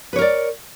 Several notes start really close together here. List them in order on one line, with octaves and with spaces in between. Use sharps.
B4 C#5 A#4 D5